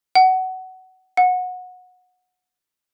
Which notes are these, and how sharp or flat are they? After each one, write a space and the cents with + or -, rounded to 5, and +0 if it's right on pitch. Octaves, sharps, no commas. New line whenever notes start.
F#5 +20
F#5 -20